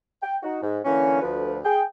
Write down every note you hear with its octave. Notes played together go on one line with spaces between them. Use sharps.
G5
D#4 F#4
G#2
D3 E3 A#3 C#4
D2 F3 B4
G#4 G5